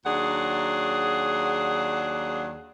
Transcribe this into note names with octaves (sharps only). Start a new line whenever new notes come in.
D#2 F#3 D4 G#4 F#5